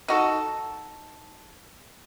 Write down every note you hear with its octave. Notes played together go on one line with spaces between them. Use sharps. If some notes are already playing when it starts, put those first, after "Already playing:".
D#4 F#4 A4